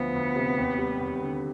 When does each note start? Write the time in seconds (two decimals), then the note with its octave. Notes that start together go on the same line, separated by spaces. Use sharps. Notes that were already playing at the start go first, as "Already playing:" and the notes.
Already playing: D2 F3 B3
0.14 D2
0.36 C3
0.57 D#2
0.78 G3
1.00 D#2
1.22 D3